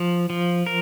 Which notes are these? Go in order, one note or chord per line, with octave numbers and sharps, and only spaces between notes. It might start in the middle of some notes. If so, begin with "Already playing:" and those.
Already playing: F3
F3
A#4